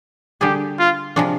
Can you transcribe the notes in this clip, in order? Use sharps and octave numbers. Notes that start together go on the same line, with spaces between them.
D3 G3 D4 G4 G#4
F4
C3 F3 G#3 D4